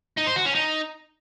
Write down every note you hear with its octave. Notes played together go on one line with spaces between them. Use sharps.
D#4
C5
F#4
C#4
D#4